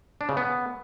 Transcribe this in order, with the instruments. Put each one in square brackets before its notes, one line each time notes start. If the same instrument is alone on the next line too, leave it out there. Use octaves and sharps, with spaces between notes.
[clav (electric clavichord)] D4
C#3
B3